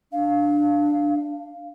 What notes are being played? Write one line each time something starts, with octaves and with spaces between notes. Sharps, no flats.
D4 F5